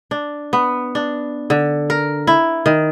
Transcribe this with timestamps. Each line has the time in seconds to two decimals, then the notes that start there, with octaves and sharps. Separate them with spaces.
0.11 D4
0.53 B3
0.95 D4
1.50 D3
1.90 A#4
2.27 E4
2.66 D#3